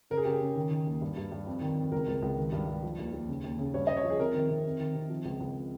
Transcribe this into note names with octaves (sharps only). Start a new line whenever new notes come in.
C#3 A#4
G#4
C#3 G4
G#4
C#3
D#3
D#3
D#2
G2
G2
G2
F2
D#3
F2
C#2 A#4
C#2
C#2
D#3
G2
G2
F3
D#2
D#2
C#3
D#2
C#3
G2 C#5
G2 D#5
C#5
F3
G#4
C3 A#4
D#3
C3
F2
D#3
C3
F3
C#2
C#2